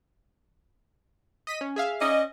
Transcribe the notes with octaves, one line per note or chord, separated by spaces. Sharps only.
D#5 B6 D#7
C#4
G#4 E5 F5
C#4 D5 D#5